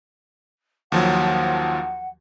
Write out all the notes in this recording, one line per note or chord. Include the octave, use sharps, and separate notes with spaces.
D#2 F3 F#3 F#5